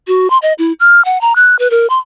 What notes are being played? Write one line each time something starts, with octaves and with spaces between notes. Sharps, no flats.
F#4
C6
D#5
E4
F6
F#5
A#5
F#6
B4
A#4
C6